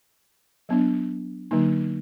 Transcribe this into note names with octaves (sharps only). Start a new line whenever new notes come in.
F#3 B3 D4
D3 F#3 A#3 D#4